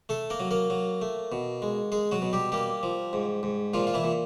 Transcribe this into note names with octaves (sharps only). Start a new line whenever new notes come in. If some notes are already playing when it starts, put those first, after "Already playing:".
A3 A4
A#3 A#4
F#3
A#3 A#4
F#3
A3
B2
G#3
G#3 G#4
F#3 F#4
B2
G3 G4
G3 A#3 G4
F3
G#2
G#2
A#2 F3 F4
F4
E3 E4
A#2